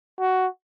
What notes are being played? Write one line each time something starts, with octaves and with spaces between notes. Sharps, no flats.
F#4